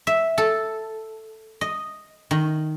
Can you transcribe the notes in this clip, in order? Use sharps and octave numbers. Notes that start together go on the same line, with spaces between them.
E5
A4
D#5
D#3